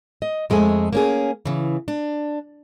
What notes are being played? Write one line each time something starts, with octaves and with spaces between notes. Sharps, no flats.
D#5
F2 G#3 A3 G#5
A#3 C#4 G#4
C#3 E3
D4